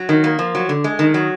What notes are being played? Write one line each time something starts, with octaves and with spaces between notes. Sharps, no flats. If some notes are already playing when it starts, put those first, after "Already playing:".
Already playing: F#3
D#3
A#3
F3
F#3
D3
G#3
D#3
F#3